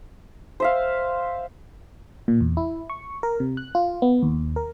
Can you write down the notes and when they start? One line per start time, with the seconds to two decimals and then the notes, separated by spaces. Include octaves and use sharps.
0.60 C5 E5 F5
2.28 A#2
2.41 E2
2.57 E4
2.90 C#6
3.23 A#4
3.40 C3
3.57 F#6
3.75 F4
4.02 B3
4.22 D#2
4.56 A#4